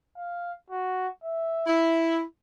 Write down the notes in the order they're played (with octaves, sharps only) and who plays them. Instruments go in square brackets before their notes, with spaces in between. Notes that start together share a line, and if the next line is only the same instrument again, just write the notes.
[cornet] F5
F#4
E5
[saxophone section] E4